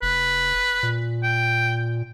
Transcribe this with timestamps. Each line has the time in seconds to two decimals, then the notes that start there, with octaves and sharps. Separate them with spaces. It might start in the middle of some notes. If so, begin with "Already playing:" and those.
0.02 F1 B4
0.83 A#2
1.23 G5